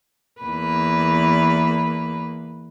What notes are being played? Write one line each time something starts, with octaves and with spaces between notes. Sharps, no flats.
E2 A#3 B4